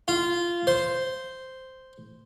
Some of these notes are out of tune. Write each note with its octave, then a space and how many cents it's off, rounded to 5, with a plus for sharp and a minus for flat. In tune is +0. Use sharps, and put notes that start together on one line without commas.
F4 -15
C5 -5